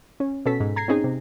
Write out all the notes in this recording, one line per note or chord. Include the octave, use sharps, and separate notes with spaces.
C#4
B2 C#4 A4 B6
G#2
A#5 G#6 A#6 C7
C4 C#4 D#4 G#4
C3